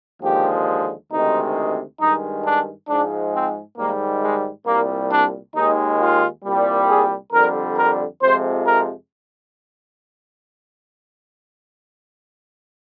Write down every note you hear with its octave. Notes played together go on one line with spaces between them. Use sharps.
D#2 D3 F3 G#3 G4
D2 C3 D#3 G#3 D#4
G2 D#3 G#3 D#4
D4
G#2 F3 G#3 D4
C4
G#2 D#3 G3 A#3
G#3
C2 A#2 G3 A#3
D4
D#2 D#3 G#3 D#4
F4
C2 A#2 G3
G#4
F2 D3 G3 A#4
A#4
F2 C3 F3 G#3 C5
A#4